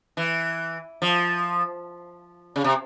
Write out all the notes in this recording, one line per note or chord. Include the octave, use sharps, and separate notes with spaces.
E3
F3
C#3
C3